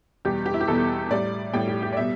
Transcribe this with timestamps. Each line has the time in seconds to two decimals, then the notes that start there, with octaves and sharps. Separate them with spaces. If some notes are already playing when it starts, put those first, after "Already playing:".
0.25 E2 B2 G3 G4
0.46 G4
0.54 E4
0.61 G4
0.68 E2 B2 G3 A4
1.10 A2 G3 D5
1.53 A2 G3 G5
1.67 G4
1.82 G4
1.93 D5
1.97 B2 G3 E5